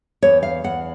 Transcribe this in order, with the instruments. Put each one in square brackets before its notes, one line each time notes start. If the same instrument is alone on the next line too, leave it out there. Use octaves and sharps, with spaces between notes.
[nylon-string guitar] E2 C#5
F5
E2 F#5